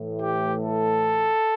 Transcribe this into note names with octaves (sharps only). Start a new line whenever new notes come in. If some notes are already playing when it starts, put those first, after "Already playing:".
Already playing: A2 E3 A3
G4
A4